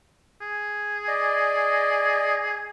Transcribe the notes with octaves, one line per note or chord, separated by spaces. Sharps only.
G#4
D5 D#5